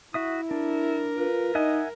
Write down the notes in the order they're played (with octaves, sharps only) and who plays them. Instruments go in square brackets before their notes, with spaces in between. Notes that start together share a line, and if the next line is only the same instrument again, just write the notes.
[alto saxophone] E4 [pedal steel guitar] F#4 E5 D#6
[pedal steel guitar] D4 [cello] A#4
[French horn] F4 [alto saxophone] B4
[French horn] D#4 [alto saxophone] D#5 [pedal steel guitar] E5 F#5 G#5